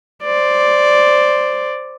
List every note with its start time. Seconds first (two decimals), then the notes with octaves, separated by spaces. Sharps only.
0.23 C5 D5